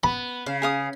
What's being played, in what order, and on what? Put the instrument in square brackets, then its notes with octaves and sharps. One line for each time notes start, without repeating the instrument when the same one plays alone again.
[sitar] B3 [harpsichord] B5
[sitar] C#3 [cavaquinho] F5
[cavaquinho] G#4 F5 D#6